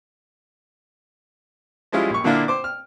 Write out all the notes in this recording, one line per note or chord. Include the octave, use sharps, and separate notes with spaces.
F3 G3 G#3 C#4 E4 F4
A#1 C#6
A#2 D3 A#3 D4 E4 F4
C5 D6
F6